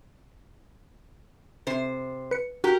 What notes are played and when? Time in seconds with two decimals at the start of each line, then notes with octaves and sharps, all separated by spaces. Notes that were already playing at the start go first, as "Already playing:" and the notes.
1.67 C3 C5
2.31 B4 C#7
2.64 F#4 G4 A#4